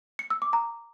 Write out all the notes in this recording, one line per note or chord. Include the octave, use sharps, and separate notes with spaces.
C#7
E6
D6
A#5